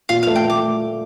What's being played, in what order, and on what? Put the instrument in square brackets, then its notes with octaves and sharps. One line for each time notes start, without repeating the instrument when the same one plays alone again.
[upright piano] A#2 [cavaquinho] F5
[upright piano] A3 [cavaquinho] F5
[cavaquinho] G5
[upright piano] A3 [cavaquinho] D6